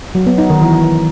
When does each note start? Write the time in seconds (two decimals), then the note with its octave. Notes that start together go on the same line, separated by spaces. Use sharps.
0.15 F#3
0.27 B3
0.38 D#4
0.50 D#3
0.62 E3